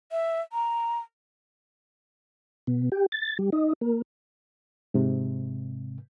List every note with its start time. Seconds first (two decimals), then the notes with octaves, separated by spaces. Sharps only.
0.12 E5
0.53 A#5
2.67 B2
2.92 G4
3.12 A6
3.39 G3
3.52 D#4
3.81 A#3
4.94 G#2 C3